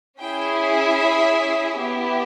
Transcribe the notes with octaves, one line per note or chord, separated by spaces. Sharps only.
C#4 E4 G#4 G5
E5
B3 E4 G4